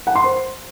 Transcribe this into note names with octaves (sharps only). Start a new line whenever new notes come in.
F#5
C6
C5